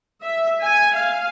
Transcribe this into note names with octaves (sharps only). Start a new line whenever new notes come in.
E5
G#5
F5